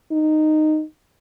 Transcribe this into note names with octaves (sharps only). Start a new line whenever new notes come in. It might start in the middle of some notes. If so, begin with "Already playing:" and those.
D#4